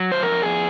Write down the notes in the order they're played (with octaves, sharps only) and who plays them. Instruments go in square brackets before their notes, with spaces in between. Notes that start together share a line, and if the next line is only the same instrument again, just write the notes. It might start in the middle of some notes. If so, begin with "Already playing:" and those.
Already playing: [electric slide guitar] F#3
C5
F2 A#4
G#4